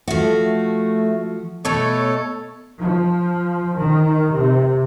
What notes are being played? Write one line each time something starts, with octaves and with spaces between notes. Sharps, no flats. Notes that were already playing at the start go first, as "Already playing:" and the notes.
F3 A3 F#4
B2 A3 A4 C#5
F3
D#3
C3